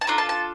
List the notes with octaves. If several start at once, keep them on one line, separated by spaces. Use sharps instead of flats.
A5
D4 F4 A4 A#5
A5
A5